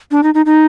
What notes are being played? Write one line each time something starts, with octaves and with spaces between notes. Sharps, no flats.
D4
D#4
D#4
D#4